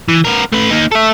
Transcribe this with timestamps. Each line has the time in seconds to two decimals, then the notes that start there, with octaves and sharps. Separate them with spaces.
0.09 E3
0.24 B3 A#4
0.52 A3 B4
0.70 A#3 D#4
0.92 A4 E5